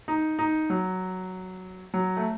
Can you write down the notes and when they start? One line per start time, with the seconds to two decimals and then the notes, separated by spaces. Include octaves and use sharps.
0.08 D#4
0.39 D#4
0.70 F#3
1.94 F#3
2.17 A3